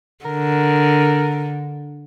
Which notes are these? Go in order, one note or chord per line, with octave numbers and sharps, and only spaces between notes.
D3 A#4